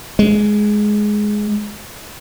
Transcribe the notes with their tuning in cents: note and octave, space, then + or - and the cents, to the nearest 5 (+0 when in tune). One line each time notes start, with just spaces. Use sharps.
G#3 +10